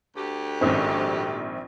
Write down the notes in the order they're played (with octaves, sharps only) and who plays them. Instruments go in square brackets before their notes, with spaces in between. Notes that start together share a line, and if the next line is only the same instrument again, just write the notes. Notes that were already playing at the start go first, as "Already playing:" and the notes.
[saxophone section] D2 G4
[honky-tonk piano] A#1 C4 [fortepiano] G#2 D#3 C#4